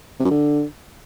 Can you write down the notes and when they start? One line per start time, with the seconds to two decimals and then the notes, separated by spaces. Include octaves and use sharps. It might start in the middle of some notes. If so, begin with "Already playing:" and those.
0.20 C3
0.25 F#2
0.31 D3